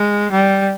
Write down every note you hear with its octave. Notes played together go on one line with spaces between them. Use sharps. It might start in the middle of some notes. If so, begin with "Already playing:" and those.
Already playing: G#3
G3